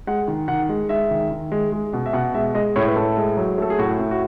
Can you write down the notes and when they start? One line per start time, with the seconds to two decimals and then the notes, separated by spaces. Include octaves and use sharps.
0.07 G#3 F#5
0.28 D#3
0.48 D#3 F#5
0.69 G#3
0.89 G#3 E5
1.10 D#3
1.31 D#3
1.52 G#3
1.72 G#3
1.93 B2
2.06 E5
2.13 B2 F#5
2.34 G#3 E5
2.54 G#3 D#5
2.76 A2 C#5
2.88 B4
2.96 A2 A4
3.17 G#3
3.37 F#3
3.58 A3 A4
3.70 G#4
3.79 A2 F#4
3.99 A2
4.11 F#4